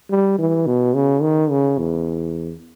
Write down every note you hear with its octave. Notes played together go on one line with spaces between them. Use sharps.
G3
E3
B2
C#3
D#3
C#3
E2